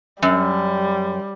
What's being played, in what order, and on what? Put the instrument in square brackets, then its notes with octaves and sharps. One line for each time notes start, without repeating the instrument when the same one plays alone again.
[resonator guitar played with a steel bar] F#2 [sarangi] G3